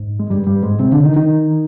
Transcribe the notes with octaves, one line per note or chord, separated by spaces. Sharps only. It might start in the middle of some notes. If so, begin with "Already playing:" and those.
Already playing: G#2
G#3
G2 G3
G2 G3
G#2 G#3
C3 C4
D3 D4
D#3 D#4
D#3 D#4